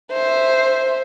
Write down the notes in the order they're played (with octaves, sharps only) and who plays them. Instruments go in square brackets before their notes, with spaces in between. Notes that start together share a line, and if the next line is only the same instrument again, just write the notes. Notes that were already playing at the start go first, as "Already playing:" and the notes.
[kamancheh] C5 E5